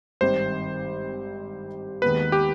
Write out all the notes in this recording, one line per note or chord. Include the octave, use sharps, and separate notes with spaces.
G#1 G2 D#3 G3 C4 C5
D#2 D#3 G#3 B3 B4
G4